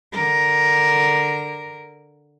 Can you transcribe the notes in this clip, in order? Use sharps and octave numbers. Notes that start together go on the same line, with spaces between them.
D3 A#4